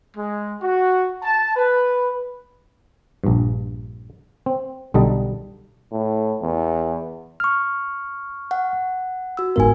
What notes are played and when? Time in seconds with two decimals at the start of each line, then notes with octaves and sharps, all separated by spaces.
0.17 G#3
0.61 F#4
1.23 A5
1.56 B4
3.24 A#1 G2
4.46 C4
4.94 B1 D3 G3 A4 D#5 A#5
5.92 A2
6.41 E2
7.40 C#6 F6
8.51 F#5
9.37 F#4 E6
9.56 G1 G#2 B3 A#4 G#5